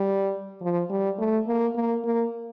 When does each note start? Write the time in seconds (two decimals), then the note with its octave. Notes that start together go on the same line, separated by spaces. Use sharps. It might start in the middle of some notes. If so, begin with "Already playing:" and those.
Already playing: G3
0.61 F3
0.90 G3
1.18 A3
1.47 A#3
1.76 A#3
2.05 A#3